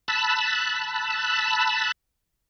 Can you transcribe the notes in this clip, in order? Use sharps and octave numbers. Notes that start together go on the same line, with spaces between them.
A5 B5 E6 F#6